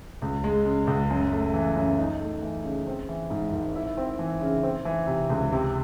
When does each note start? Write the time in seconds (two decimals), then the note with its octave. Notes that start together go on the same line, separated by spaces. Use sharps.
0.22 C#2
0.44 G#3
0.65 C#3
0.87 C#2
1.10 F#2
1.32 A3
1.54 E3
1.76 F#2
1.98 D#4
2.20 A3
2.42 E3
2.64 C#3
2.87 C4
3.09 E3
3.30 G#2
3.52 G#1
3.76 E4
3.97 C4
4.19 E3
4.41 C#3
4.63 C4
4.85 E3
5.07 C3
5.30 C#2
5.52 C3